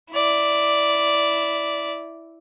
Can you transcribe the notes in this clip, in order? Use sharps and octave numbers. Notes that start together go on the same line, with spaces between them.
E4 D5